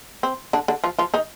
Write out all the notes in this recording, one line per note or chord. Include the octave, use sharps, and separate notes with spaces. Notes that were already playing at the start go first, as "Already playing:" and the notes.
C4
D3 D4
D3 D4
F3 F4
F3 F4
D#3 D#4